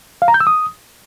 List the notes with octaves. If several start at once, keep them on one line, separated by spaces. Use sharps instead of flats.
F5
A#5
G6
E6
D#6